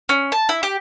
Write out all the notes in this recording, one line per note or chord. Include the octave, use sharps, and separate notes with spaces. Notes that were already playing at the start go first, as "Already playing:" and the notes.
C#4
A5
E4
G4